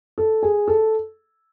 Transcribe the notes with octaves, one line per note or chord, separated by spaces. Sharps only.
A4
G#4
A4